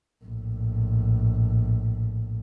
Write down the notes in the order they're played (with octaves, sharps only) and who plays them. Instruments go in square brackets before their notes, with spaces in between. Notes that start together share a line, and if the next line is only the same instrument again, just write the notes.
[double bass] A#1 A2